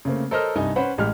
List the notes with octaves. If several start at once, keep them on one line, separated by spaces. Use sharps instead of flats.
C#3 A3 A#3 C4
A4 A#4 C5 C#5 D#5 F6
C2 G2 D#4 D#5 G#5
C#4 B4 C5 F#5 B5
A1 G#3 G4 F6